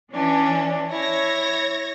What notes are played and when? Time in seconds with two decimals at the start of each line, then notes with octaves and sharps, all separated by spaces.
0.14 E3 C#4 D4
0.91 E4 C#5 G#6 A#6